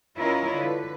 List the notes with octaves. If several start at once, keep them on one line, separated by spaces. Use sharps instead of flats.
C#4 E4 F4 A#4 C#5 D#5
D3 B4